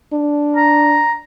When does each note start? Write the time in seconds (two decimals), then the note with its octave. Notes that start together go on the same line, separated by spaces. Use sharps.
0.13 D4
0.56 A#5